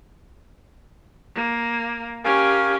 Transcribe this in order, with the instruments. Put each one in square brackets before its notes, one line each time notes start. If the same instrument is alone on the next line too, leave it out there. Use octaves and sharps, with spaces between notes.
[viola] A#3
[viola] C#4 G4 [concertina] A#4 F5 G#5